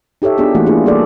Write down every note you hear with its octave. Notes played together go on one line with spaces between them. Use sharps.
D#4 G4 A4 C#5 E5
B3 D4 F4 G4 G#4
E3 A3 A#3 E4 F#4 F#5
A#3 D4 E4 F4 G#4
G3 G#3 A#3 G#4 A4 D5